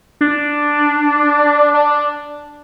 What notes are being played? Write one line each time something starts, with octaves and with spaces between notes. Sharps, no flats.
D4
D4